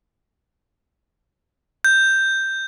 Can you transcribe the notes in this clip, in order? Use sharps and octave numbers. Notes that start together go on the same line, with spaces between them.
G6